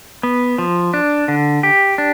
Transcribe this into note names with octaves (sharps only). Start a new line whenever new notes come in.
B3
F3
D4
D3
G4
D4